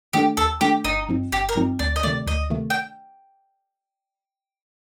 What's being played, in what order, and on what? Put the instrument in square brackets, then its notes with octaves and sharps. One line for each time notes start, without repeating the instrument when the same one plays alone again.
[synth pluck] D#3 A3 D4 A4 [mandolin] G4
[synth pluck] D#2 [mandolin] A4
[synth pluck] D#3 A3 D4 A4 [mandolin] G4
[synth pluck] G1 [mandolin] D#4
[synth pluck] G2 F3 C4 D#4
[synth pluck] G1 [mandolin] G4
[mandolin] A#4
[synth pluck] G2 F3 C4 D#4
[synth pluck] D2 [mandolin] D5
[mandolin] D#5
[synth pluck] C3 D#3 A3 [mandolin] D5
[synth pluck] D2 [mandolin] D#5
[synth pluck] C3 D#3 A3
[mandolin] G5